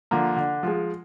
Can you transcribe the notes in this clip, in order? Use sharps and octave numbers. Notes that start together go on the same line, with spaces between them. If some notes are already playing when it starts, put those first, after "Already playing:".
D3 F3 A#3
D3
F3 G#3